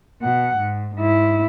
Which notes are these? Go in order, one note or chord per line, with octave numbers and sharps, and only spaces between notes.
B2 F#5
G#2
G#2 E4